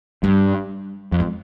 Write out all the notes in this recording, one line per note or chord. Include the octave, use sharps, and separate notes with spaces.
G2 G3
F2
G#3